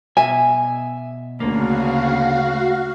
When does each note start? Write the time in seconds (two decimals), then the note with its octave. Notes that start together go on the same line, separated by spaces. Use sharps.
0.17 B2 E5 G#5
1.40 D2 C#3 A#3 F#4 F5